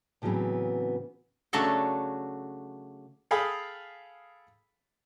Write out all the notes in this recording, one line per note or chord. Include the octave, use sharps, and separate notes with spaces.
A2 C#3 E3 F#3 B3 C4
C#3 F#3 A3 D4 F#4 A4
G#4 A4 F5 G5 B5 D#6